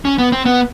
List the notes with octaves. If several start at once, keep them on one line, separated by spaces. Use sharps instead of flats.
C#4
B3
C4
B3